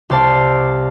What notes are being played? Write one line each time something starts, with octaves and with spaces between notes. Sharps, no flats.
C2 C5 D5 F5 A5 C7